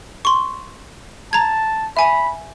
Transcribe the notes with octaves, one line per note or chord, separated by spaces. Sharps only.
C6 C#6
A5 A#5 G#6
E5 G#5 B5